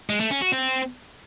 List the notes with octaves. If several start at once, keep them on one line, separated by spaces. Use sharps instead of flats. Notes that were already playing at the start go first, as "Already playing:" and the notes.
G#3
A3
C#4
F#4
C4